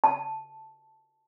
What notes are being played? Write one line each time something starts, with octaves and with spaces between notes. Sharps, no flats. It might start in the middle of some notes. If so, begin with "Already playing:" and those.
A5